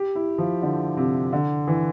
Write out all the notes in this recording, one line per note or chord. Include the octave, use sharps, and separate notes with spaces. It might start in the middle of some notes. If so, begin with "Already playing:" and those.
Already playing: G4
E4
F3
D3
C3
D3
E3